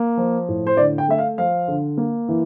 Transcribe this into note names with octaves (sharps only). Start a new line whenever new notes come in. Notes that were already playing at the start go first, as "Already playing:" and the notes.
Already playing: A#3
F3
A2
C5
D3 D5
G5
A3 E5
F5
F3 F5
D3
A#3
E3